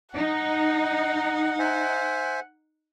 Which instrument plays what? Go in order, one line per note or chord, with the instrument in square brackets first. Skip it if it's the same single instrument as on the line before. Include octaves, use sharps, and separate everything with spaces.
[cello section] D#4 [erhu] F#5
[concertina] C5 E5 G#5